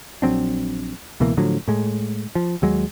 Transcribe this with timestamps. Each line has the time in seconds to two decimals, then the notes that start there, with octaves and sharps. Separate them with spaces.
0.22 A#1 F#3 C4 D4
1.20 C#2 B2 E3 A#3
1.37 A2 D3 F3 F#3
1.68 A2 G#3
2.35 F3
2.62 D#2 F#3 G#3